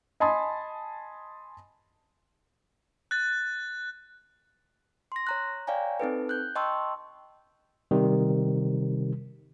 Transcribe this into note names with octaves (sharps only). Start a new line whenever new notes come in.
D#5 G#5 A5 B5 C6 D#6
F#6 A6
C6 A#6
C#5 A#5 F#6
C#5 D5 F5 G5 G#5 A#5
C4 D#4 A4 B4
F#6 G6
D#5 G5 A5 C6 C#6 E6
C3 D#3 G3